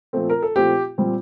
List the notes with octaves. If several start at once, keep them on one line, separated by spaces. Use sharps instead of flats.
A#2 F3 A3 C4
A#4
A4
A#2 F3 A3 C4 G4
A#2 G3 C4